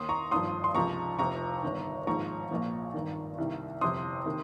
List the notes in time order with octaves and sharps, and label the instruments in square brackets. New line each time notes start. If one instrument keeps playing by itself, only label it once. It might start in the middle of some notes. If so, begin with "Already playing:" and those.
Already playing: [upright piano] D#2 D#3 C6 D#6
A#5 C#6
G#1 G2 F3 C6 D#6
C6
C#2 C3 F3 A#5 C#6
F1 F2 C3 F3 A#5 C#6
G1 G2 D#3
G#1 G#2 F3 A#5 C#6
A#1 A#2 F3
G#1 G2 D#3
C2 C3 D#3
G1 F2 C3 C6 D#6
C3 D#3